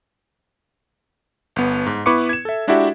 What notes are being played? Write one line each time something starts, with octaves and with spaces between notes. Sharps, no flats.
G1 B3
G#2
B3 E4 B4 C#6 D6 C#7
G#6 E7
A4 E5
G#3 D4 E4 F#4 G4 E5